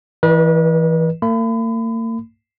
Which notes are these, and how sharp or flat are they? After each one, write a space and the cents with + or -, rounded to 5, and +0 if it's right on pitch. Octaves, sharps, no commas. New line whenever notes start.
E3 +0 B4 -40 D5 +45
A#3 -45 B5 +35